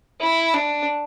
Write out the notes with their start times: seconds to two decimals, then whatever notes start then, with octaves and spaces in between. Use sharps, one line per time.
0.20 E4
0.53 D4